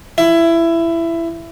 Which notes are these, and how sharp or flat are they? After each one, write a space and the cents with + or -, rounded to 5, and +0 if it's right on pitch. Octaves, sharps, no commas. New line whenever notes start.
E4 +15